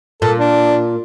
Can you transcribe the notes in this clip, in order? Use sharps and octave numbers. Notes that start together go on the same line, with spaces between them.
A#2 A4
D4